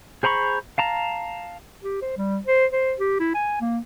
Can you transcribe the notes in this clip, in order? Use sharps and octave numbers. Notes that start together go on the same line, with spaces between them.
G#4 C5 A#5 B5 C#6
F5 A5 A#5
G4
C5
G3
C5
C5
G4
E4
G#5
A#3